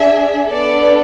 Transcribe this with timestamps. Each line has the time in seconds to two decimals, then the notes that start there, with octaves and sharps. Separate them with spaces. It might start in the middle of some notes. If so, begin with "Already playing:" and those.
Already playing: D4 G#4 E5
0.51 B3 D4 A4 D5